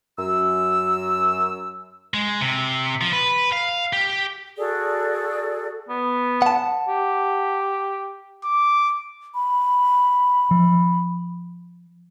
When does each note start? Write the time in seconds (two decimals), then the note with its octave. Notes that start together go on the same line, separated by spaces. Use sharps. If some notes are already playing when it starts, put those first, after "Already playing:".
0.19 F#2 E6
2.14 G#3
2.41 C3
3.01 F3
3.13 B4
3.52 F5
3.93 G4
4.56 F#4 G#4 A4 D5
5.89 B3
6.42 F#5 A5
6.88 G4
8.44 D6
9.35 B5
10.51 F3